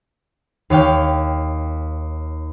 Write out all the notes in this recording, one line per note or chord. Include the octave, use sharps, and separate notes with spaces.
D#2 C#5 F5 G5